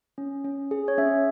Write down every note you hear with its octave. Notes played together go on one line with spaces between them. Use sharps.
C#4
C#4
G#4
C#5
C#4 E5